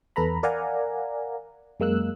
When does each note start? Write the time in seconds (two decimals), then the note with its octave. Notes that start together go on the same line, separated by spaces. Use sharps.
0.16 E2 A4 B4 A#5 B5
0.43 A#4 D5 F5 F#5 G#5 A#5
1.80 F#2 G#3 A#3 E6 F#6